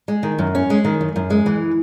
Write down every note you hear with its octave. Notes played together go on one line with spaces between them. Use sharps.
G#3
D#3
F#2
C#4
G#3
D#3
F#2
F#2
G#3
E3